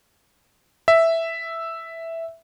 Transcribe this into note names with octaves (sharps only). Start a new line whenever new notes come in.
E5